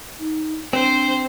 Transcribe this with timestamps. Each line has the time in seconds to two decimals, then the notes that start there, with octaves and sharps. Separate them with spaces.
0.19 D#4
0.73 C4 D4 C5